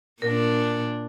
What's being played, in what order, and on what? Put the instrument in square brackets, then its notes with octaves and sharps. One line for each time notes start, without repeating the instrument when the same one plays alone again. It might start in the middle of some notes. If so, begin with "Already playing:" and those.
[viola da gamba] A#2 D4 [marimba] A#4